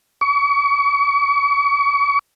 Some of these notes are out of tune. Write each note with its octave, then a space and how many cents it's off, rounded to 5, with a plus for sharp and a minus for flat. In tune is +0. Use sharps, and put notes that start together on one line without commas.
C#6 +40